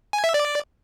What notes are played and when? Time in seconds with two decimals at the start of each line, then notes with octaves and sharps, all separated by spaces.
0.13 G#5
0.24 E5
0.34 D5